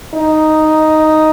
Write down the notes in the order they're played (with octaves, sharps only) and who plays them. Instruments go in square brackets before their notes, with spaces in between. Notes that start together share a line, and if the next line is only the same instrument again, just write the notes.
[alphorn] D#4